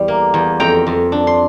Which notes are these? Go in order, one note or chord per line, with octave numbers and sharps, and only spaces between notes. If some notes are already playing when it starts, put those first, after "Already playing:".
Already playing: E2 G3
A#3
E2
F2 G5 A#5
F2
D4
C6